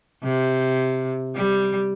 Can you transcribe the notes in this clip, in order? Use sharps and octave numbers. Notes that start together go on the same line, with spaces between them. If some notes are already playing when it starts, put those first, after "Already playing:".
C3
G3